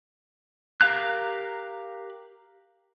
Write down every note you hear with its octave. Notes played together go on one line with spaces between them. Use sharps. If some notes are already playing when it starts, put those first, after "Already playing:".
G4 A#4 F5 A#5 F#6